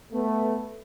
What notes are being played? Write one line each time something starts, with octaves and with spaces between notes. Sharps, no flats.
A3 B3